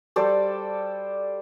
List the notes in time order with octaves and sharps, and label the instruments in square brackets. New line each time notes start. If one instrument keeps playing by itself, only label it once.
[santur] G3 A4 C5 D5